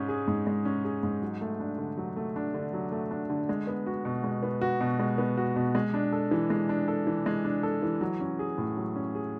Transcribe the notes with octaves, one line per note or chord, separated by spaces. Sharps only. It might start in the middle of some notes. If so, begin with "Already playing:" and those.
Already playing: G#2 G#3 C#4
G#4
G#2
G#3
C#4
G#4
G#2
F#3
A3
D4
D3
F#3
A3
D4
D3
F#3
A3
D4
D3
G#3
B3
F#4
B2
G#3
B3
F#4
B2
G#3
B3
F#4
B2
G#3
D4
A4
E3
G#3
D4
A4
E3
G#3
D4
A4
E3
F#3
C#4
G#4
A2
F#3
C#4
G#4